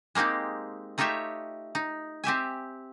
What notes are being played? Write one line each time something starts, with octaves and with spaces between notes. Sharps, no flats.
G#3 A#3 C4 D#4 G4
A3 D#4 F4 G4 C#5 E5
D#4
C4 G4 E5 G#5